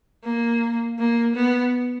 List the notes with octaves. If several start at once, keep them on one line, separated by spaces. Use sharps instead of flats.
A#3
A#3
B3